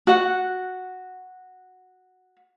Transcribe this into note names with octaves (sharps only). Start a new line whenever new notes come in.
F#4 F#5